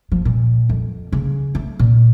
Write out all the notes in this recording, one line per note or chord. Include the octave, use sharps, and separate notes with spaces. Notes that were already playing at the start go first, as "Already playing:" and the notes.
F3
A#2
F2
C#3
A3
A#2